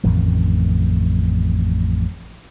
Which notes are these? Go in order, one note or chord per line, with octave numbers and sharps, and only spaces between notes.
A1 F2 D#3